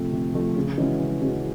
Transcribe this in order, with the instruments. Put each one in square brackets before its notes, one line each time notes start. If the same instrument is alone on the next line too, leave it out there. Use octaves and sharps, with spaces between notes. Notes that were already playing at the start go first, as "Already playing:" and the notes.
Already playing: [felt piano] C3 F3 A3
C3
F3 A3
C#3
E3 G#3 C#4 F#4
C#3
E3 G#3 C#4 F#4